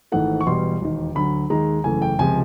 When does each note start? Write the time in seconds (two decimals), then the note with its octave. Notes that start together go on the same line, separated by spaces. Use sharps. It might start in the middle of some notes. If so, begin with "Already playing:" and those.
0.12 G#1 G#2 E3 A3 F#5
0.41 C#6
0.46 E1 E2 B2 G3 C6
0.81 E1 D#2 D#3
1.15 D2 D3 F#3 B5
1.50 D#2 D#3 G#3 A#5
1.84 F#1 E2 C#3 E3 A3 G#5
2.02 G5
2.19 C#2 C3 F3 G#3 G#5